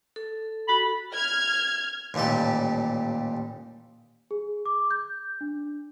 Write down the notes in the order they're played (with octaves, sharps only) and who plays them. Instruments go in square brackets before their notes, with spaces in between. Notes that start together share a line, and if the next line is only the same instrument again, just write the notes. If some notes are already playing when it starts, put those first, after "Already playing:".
[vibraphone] A4
[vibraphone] F#4 A4 [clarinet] B5
[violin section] F6 G#6
[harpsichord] A1 D#2 A#2 G3 A4
[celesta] G#4
D6
G6
D4